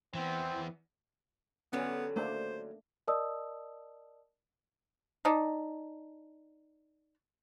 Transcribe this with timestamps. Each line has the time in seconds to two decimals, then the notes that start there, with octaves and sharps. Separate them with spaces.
0.14 E3 B3 C4
1.73 D3 F#3 G3 B3 C#4
2.16 A3 A#3 D4 C5
3.07 A#4 D5 D#5 A5 D#6 E6
5.25 D4 D#4